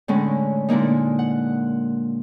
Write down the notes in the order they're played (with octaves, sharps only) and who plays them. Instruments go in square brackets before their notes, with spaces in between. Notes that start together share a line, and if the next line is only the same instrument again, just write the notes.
[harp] A2 D3 G#3 C#4
A#2 D3 G#3 A#3 D#4
F#5